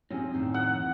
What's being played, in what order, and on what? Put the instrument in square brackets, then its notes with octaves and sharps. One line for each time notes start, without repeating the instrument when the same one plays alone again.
[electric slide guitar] F3 C4 D#4 [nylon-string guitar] C#4 G4 G#4
[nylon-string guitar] D#2 A2 D#3
[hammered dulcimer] F#5
[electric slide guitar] E3